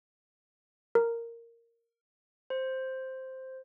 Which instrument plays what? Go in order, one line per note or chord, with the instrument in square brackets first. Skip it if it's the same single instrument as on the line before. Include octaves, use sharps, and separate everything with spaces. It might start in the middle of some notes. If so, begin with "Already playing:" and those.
[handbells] A#4
C5